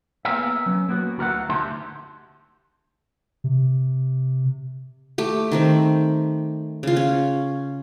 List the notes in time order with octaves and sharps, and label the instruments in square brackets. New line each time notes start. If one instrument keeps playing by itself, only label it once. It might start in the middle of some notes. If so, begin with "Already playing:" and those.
[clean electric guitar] A#3 B3 G#4 A#4 E5
F#3 C#4
A#3 B3 F#4
D2 F#4 A#4 E5 F#5
D2 D#4 G4 E5 A5 C6
[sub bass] C3
[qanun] A3 G4
D#3 A3 C4
C#3 F4
C#4